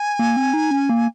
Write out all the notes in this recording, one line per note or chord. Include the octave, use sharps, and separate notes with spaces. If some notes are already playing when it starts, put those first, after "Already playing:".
Already playing: G#5
A#3
C4
D#4
C#4
A#3